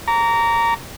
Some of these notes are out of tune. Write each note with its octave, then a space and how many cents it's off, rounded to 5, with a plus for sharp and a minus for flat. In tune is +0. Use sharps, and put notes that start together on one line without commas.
A#5 -10 D6 -40